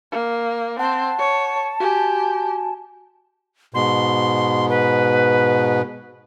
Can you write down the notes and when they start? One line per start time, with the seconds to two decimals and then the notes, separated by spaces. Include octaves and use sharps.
0.12 A#3
0.79 C4 F#5 A5
1.18 C#5
1.80 F#4 G4 G#5
3.74 G#2 B2 C6
4.69 B4